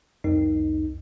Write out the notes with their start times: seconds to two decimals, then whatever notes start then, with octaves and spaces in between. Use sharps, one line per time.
0.24 C2 F2 D#4